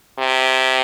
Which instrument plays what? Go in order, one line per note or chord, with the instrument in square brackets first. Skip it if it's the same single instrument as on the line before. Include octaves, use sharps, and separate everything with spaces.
[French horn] C3